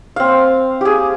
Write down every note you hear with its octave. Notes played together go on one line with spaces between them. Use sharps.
C4 F5
G4 G#4